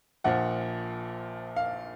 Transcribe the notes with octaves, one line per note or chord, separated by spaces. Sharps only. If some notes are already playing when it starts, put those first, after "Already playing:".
A#1 A#2 F3 F#5
F5